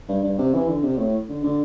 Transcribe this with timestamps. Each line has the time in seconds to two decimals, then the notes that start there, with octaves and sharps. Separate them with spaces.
0.09 G2
0.23 G2
0.38 C3
0.54 E3
0.68 D3
0.84 C3
0.98 A2
1.29 D3
1.44 D3